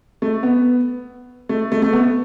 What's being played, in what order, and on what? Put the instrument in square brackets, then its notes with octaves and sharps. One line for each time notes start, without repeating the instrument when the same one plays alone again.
[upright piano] A3
B3
A3
A3
A3
B3